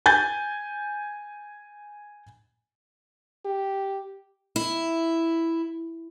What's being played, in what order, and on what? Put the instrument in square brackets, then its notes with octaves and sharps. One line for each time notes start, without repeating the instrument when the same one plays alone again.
[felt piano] G#5 G6 A6
[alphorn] G4
[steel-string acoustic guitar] E4